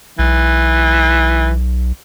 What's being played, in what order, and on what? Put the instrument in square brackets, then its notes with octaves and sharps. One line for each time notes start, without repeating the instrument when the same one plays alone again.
[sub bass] B1 [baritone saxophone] E3